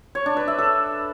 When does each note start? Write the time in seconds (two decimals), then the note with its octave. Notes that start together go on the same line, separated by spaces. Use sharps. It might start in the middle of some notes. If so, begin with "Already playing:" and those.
0.15 C#5
0.26 D4
0.37 B4
0.48 E5
0.58 A4